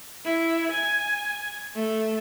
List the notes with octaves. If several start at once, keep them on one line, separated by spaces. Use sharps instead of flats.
E4
G#5
A3